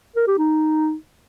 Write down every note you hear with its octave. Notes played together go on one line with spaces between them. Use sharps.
A#4
G4
D#4